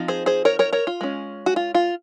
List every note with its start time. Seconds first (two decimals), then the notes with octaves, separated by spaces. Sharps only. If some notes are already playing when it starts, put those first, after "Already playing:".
Already playing: F3 C4 D#4
0.08 G#4 C5
0.26 G#4 C5
0.45 A#4 C#5
0.59 A#4 C#5
0.73 A#4 C#5
0.87 F4
1.01 G#3 C#4
1.46 F#4
1.56 F4
1.75 F4